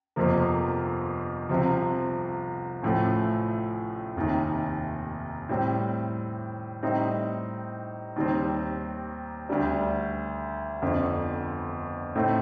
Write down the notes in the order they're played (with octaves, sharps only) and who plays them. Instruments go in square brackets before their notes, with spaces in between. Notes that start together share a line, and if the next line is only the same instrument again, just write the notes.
[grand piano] G1 F2 C3 F3 A#3
C2 C3 F3
A1 A2 F3 A3
F1 D#2 D#3
A2 G3 C4
A2 G3 C4 D#4
D#2 D#3 G3 C4
D2 D3 G3 D4
G1 F2 D3
A2 A3 C4 D#4